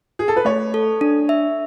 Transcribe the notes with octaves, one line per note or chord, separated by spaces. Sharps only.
G#4
A4
B4
A3 C#5
A4
D4
E5